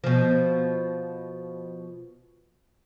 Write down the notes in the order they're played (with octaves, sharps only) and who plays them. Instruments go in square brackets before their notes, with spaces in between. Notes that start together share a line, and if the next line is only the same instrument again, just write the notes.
[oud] B2 F3